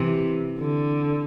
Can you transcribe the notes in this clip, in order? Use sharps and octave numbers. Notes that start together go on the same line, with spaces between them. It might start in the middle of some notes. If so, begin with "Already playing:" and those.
Already playing: C3 E3
D3